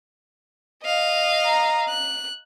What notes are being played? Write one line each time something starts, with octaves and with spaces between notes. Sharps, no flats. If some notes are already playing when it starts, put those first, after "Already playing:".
D#5 F5
A#5
F#6